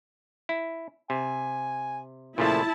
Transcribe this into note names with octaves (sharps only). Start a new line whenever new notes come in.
E4
C3 G#5
A#2 C#3 F3 A3 E4 A5